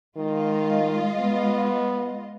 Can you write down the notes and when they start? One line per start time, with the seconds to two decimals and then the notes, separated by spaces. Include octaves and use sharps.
0.17 D#3 G#3 F4 D#5
1.21 B3